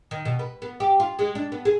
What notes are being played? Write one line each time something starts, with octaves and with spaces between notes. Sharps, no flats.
D#3
B2
B4
B3
G4
F4
G#3
D4
B3
G#4